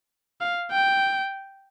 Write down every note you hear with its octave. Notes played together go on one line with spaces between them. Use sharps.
F5
G5